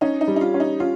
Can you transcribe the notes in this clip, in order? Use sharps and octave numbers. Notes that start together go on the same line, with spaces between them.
C#4 D#4
D#4
G3
D#4
F4
C#4
D#4
C#4 F4